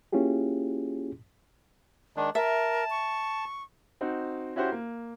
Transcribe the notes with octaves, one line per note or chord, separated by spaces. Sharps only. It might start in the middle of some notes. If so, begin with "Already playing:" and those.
A#3 C#4 E4 F4 G4 G#4
D#3 G#3 D4
A#4 E5 A5
C#6
C4 D#4 F#4
C#4 E4 F#4 G4 C5
A#3